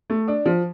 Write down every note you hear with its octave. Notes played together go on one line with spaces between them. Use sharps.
A3
D4
F3